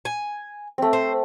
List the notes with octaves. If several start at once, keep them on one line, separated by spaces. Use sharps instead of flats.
G#5
A3 C4
C5